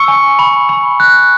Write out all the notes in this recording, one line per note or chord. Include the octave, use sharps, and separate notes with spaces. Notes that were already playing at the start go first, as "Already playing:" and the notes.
Already playing: C#6 E6 C#7
G#5
B5
B5
F#6